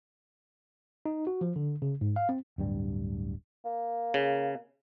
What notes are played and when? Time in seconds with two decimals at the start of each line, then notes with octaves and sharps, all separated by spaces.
1.06 D#4
1.27 F#4
1.41 F3
1.56 D3
1.82 C#3
2.01 G#2
2.16 F5
2.29 C4
2.58 D1 G2 G3
3.65 A#3
4.14 C#3